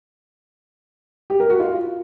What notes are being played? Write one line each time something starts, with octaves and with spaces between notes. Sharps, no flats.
G4
A#4
F#4
F4